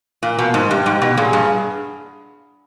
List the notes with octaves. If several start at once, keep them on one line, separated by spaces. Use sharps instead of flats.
A#2 A#3
B2
G#2
G2 G4
G#2
B2
A#2 G#4
G2